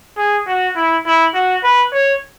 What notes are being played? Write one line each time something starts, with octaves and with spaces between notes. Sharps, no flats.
G#4
F#4
E4
E4
F#4
B4
C#5